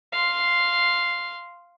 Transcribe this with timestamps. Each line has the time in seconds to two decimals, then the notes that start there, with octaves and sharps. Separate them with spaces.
0.12 F5 C6